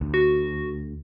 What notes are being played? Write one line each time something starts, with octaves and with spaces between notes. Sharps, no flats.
D2
F#4